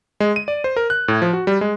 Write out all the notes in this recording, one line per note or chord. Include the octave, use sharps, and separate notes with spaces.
G#3
D#7
D5
C5
A#4
F#6
A2
F3
F#4
G3
G#3